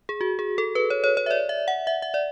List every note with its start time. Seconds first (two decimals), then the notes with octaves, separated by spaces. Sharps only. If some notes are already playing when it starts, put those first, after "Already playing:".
0.09 G#4
0.21 F#4
0.39 G#4
0.58 A4
0.75 B4
0.90 C#5
1.04 C#5
1.17 C#5
1.26 E5
1.31 D5
1.49 E5
1.68 F#5
1.87 E5
2.02 E5
2.14 D5